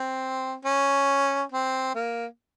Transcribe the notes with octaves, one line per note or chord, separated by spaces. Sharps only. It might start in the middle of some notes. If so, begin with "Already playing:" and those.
Already playing: C4
C#4
C4
A#3